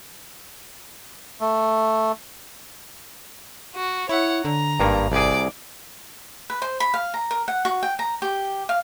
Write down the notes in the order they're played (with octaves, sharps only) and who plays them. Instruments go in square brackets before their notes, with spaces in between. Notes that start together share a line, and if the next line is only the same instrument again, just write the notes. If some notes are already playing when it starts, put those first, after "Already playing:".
[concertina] A3
[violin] F#4
[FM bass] E4 [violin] C#5 F#5
[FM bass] D3 [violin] A#5
[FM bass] G#1 [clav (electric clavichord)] G2 A#3
[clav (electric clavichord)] C2 G#4 [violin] D5 D6
[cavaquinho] B4
C5
B5
F5
A#5
A#4
F#5
F#4
G5
A#5
G4
F5